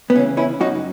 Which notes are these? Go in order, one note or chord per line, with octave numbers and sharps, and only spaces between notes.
B3
C#3 E3 C#4
C#4 E4
F#2 D#4 F#4